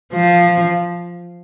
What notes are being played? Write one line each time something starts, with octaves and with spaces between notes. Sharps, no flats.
F3